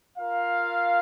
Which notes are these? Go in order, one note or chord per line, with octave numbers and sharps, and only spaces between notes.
F4 A#4 F5